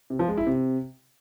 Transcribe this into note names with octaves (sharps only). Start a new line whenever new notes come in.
C3
F3
G#3
E4
C3